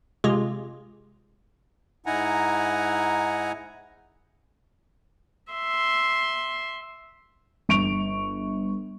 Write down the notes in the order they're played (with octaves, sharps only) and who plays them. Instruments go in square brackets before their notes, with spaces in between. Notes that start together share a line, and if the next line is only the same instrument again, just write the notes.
[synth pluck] C3 G#3 F4 G4 G#4
[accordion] G#2 D#4 E4 F#5 G#5 A#5
[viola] E5 C6
[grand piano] G1 C#6 D7 F7